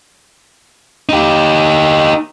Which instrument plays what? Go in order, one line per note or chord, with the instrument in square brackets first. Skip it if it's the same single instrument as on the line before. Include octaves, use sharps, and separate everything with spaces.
[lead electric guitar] D#4 G4